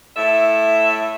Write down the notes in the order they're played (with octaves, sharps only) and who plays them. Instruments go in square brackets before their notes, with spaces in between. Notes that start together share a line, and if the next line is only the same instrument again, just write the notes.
[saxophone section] A2 A4 E5